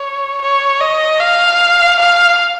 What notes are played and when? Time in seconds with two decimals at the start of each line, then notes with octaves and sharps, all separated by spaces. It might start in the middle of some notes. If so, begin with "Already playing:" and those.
Already playing: C#5
0.42 C#5
0.81 D#5
1.21 F5
2.00 F5